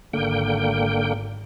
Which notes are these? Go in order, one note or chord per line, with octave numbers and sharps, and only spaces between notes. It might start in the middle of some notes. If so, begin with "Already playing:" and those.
G#1 D3 A#3 G5